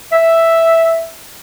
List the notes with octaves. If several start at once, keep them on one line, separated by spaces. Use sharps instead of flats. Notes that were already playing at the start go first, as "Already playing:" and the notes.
E5